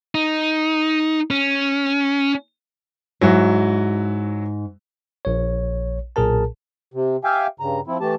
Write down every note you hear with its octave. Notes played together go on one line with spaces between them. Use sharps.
D#4
C#4
G#2 F#3 E4 F#4
A#1 C#5
B1 A#2 G#4 A#4 A5
C3
G4 E5 F5 G5 G#5
G2 C#3 A#5
F3 C4 E4
E3 A3 G4 A5